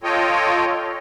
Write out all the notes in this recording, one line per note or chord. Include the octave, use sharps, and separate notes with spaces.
F4 A4 C#5 D#5 G5